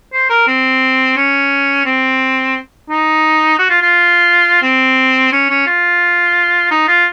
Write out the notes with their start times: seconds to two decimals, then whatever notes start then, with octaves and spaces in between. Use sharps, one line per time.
0.13 C5
0.30 A#4
0.47 C4
1.17 C#4
1.85 C4
2.90 D#4
3.59 F#4
3.70 F4
3.82 F4
4.63 C4
5.32 C#4
5.50 C#4
5.67 F4
6.71 D#4
6.88 F4